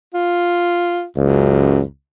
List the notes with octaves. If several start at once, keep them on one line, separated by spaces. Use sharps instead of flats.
F4
C#2 F#2